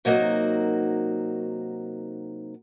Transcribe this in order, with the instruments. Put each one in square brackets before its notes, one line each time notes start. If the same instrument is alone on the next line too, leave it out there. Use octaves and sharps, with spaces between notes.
[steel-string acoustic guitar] C3 F#3 A#3 D#4 F#4 A#4